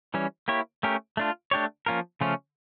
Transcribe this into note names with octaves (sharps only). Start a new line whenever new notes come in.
E3 G3 C#4
A#3 E4 G4 C#5
A3 C#4 G4 A#4
A3 D4 F4
A3 D4 G4 C#5
F3 A#3 C#4 F4 A#4
C#3 F3 A3 C#4 F4